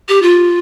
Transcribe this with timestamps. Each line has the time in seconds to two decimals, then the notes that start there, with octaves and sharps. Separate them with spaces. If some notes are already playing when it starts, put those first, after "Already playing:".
0.09 G4
0.22 F4